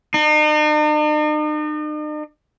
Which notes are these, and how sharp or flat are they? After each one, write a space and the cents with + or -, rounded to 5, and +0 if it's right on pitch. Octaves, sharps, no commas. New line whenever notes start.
D#4 -45